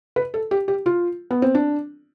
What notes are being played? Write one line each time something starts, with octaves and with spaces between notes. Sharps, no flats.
B4
A4
G4
G4
F4
B3
C4
D4